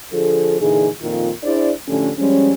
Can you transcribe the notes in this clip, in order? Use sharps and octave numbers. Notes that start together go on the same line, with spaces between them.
D3 F3 G#4 A4
A#2 D3 E3 D#4 G#4
F2 A#2 D#3 F4
D4 E4 G#4 C5 D5
A2 D3 F3 A3 C#4 G4
F3 G3 G#3 C#4